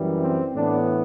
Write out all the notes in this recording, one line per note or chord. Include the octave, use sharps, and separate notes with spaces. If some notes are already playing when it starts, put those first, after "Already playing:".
Already playing: F#2 E3 G3
C4
A2 E3 B3 D4